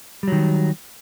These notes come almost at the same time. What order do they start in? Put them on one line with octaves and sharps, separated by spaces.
G3 F#3 D#3